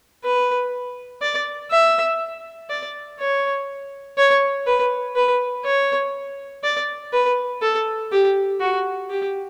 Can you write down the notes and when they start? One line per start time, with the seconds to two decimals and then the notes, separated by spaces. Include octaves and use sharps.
0.24 B4
1.22 D5
1.71 E5
2.70 D5
3.19 C#5
4.18 C#5
4.67 B4
5.16 B4
5.65 C#5
6.64 D5
7.13 B4
7.62 A4
8.12 G4
8.61 F#4
9.10 G4